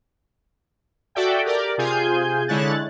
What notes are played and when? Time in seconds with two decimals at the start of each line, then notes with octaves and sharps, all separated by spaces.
1.15 F#4 A4 D5 E5 G5
1.45 G4 A#4 D5
1.78 C3 F4 G#4 G#5 G6
2.48 D3 G#3 E4 C#5 F#6 A6